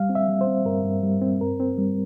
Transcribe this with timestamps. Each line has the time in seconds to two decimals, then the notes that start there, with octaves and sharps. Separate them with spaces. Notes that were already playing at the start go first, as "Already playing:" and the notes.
Already playing: G3 F5
0.09 C4
0.15 E5
0.29 G3
0.41 C5
0.47 C4
0.65 G2 A#4
0.84 G2
1.03 G3
1.22 C4
1.41 G2 A#4
1.60 C4
1.78 G3